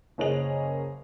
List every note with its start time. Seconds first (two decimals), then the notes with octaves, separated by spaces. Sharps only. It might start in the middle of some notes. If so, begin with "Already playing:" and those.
0.18 F#1 A#3 C#4 G#4 D#5 F7